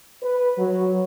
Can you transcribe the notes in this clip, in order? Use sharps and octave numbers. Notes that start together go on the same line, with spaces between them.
B4
F#3